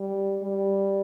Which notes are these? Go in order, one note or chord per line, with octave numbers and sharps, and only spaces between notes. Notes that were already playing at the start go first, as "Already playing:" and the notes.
Already playing: G3
G3